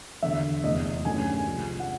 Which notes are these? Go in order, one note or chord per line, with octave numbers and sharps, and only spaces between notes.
E1 D#2 D3 E5
F1 E2 B2 D#5
G2 D#3 F#3 A3 C#4 G#5
C2 C3 F3 G#3
F#5